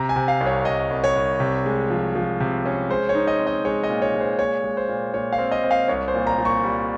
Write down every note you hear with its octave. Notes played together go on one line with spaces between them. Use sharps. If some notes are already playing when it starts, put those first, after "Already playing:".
Already playing: C3 A#5
G#5
C3
F5
C2
C#5
C2 D#5
C2
C#5
C2
C3
G#3
F3
F3
C3
C#4
G#3 C5
C#5
D#4
D#5
C4
D#5
G#3 C#5
D#5
A#2
C#5
G#3
C5
A#2 C#5
G#3
C5
A#2
A#2 C#5
F5
C4
D#5
C4
F5
C2 C#5
C5
A#2
A#5
A#2
C#6
G3